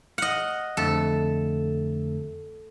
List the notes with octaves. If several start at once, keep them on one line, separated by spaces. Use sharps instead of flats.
D#5 F#5 F6
F2 D3 A3 A4